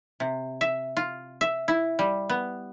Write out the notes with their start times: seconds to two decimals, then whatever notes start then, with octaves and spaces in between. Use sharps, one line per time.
0.20 C3
0.61 E5
0.97 F4
1.41 E5
1.68 E4
1.99 G3
2.29 B3